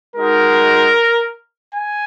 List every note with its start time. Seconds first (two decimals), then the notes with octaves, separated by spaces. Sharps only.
0.17 G#3 D#4 F#4 A#4
1.75 G#5